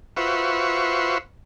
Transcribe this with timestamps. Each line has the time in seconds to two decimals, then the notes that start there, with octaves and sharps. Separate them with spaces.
0.17 F4 F#4 B4 C5 E5 C#6